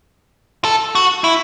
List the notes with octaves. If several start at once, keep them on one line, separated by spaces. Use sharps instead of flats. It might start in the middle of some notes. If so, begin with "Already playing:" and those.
A4
F#4
E4